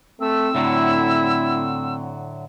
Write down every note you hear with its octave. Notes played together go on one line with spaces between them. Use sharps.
A3 C4 E6
A2 D3 F#3 E4